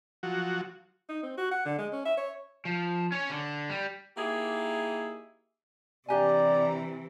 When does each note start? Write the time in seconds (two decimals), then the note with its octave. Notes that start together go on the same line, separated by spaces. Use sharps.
0.23 F3 F#3 F#4
1.09 D#4
1.23 C4
1.37 F#4
1.51 F#5
1.65 D3
1.78 G#3
1.93 C#4
2.05 E5
2.17 C#5
2.65 F3
3.12 C#4 C#5
3.30 D3
3.70 G3
4.17 A#3 D#4 E4 G4 G#4
6.09 C3 E3 D4 G4 D5 G#5 A#5